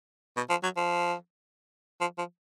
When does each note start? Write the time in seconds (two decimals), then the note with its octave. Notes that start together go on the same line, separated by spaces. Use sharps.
0.37 B2
0.50 F3
0.63 F#3
0.77 F3
2.01 F3
2.18 F3